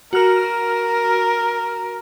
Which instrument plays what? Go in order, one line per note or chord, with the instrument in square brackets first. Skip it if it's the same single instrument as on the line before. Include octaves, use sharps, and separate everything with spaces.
[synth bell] F#4 F6 [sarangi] A#4